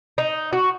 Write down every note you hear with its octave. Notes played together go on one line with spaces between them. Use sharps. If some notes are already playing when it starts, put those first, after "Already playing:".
D#4
F#4